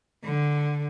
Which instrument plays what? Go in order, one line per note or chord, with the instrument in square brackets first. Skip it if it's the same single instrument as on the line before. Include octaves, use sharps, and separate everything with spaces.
[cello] D3